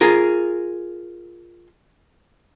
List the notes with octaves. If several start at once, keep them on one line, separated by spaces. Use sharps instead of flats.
F4 G#4 A#4